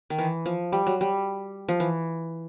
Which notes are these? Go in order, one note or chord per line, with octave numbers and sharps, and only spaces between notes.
D#3
E3
F3
G3
F#3
G3
F3
E3